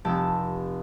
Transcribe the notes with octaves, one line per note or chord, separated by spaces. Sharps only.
F1 G4 A5 E6